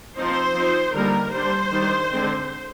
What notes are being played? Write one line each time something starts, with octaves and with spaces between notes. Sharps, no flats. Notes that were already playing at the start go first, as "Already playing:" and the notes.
F3 C4 D#4 C5
F3 C4 D#4
D3 G3 A#3 D#4 A#4
G3 D4 C5
D#3 G3 D4
D3 G#3 C4